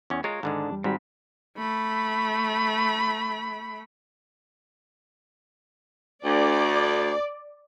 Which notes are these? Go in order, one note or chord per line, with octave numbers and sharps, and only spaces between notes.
E2 C#4
G#3 F4 A#4 C#5
G#2 D3 D#3 G#3 D4
E2 G3
G#2 D#3 G3 C4 F#4 B5
A3 B5
D2 D5